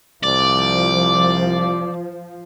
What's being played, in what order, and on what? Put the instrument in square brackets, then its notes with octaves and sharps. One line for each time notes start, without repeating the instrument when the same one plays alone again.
[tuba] C2 [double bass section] F3 [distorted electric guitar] D5